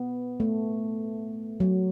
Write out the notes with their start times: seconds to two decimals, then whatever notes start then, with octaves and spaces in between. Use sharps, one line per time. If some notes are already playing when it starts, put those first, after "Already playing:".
Already playing: B3
0.40 A3
1.60 F#3